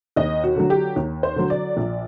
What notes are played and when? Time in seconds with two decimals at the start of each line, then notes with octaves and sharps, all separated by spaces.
0.16 D#2 D#5
0.44 F#4
0.56 D3 F#3
0.70 G4
0.96 D#2
1.23 C5
1.36 D3 F#3
1.50 D5
1.77 A#1